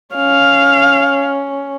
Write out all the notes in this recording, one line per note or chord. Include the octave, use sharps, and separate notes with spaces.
C#4 F5